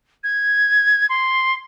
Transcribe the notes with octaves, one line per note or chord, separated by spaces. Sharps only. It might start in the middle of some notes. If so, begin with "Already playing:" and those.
G#6
C6